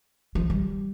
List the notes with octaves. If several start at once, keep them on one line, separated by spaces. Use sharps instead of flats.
F3
G3